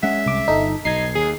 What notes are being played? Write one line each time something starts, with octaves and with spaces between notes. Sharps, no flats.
G#3 C#4 E5 F#5
C2 D6
G1 D#4 A4
B1 D#4 G#6 C7
D#2 G#4